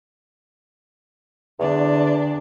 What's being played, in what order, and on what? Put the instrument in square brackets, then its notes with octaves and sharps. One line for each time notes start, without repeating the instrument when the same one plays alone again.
[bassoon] E2 [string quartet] D3 D4